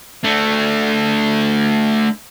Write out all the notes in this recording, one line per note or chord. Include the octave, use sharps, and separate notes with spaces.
A3 D4